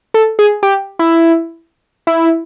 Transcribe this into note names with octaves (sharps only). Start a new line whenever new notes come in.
A4
G#4
G4
E4
E4